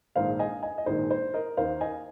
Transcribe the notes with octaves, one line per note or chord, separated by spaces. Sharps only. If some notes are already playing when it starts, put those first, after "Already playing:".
A#1 G#2 D#3 C5 F5
D#5 G#5
D#5 G#5
D#5
A#1 G#2 D#3 C5
C5
A#4 D#5
D#2 D#3 A#3 D#4 C5 F5
D#5 G#5